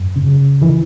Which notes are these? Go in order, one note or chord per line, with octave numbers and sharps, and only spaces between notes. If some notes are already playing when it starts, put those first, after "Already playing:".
Already playing: F#2
C#3
E3